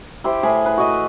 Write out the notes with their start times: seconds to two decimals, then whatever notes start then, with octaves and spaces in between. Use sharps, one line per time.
0.24 E4 G4 C5
0.43 A2 G#4 C5 B5
0.66 B4
0.77 F#4 D#5